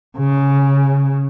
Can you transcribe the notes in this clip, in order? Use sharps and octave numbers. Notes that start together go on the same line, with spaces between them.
C#3